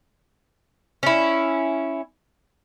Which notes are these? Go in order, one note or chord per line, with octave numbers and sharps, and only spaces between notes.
C#4 E4